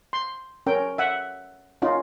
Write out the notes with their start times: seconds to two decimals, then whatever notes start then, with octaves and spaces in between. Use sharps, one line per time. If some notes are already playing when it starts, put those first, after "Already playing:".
0.13 C6
0.66 C#4 A#4 G5
0.98 E5 F#5
1.82 C#4 D#4 F4